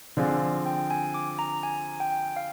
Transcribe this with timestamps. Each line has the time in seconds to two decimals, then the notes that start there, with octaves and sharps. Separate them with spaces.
0.17 D3 F3 C4 F4 G#4 D5
0.66 G5
0.90 G#5
1.14 D6
1.39 A#5
1.63 G#5
2.00 G5
2.36 F5